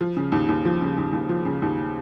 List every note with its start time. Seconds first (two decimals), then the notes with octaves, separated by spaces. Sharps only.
0.01 F3
0.17 C#3
0.32 D#2
0.49 D#2
0.65 F3
0.81 C#3
0.98 D#2
1.13 D#2
1.29 F3
1.45 C#3
1.62 D#2